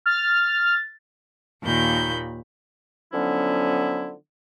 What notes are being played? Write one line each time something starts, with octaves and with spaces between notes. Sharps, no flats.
F6 A6
D#2 A#2 D#3 B5 G6
D3 F3 F#3 B3 C#4 E4